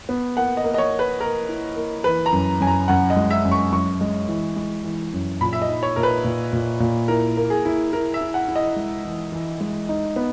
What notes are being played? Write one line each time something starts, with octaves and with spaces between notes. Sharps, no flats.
B3
A#3 F#5
D#5
A#3
D#5
C#5
A#3
B4
A#3 A#4
E4
A#3
E3 B4
A#5
F#2
F#2 G#5
A#5
F#2 F#5
D#5
G#3
E5
F#2
C#6
F#2 C#6
G#3
E3
G#3
E3
F#2
A#2 B5
E5
D#5
D#4
C#5
A#2 A#4
B4
A#2
A#2
A#2
E4 A#4
A#3
G#4
E4
E4 A#4
E5
E4
F#5
E4
D#5
G#3
E3
E3
G#3
D#4
B3